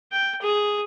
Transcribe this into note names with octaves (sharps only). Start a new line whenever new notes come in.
G5
G#4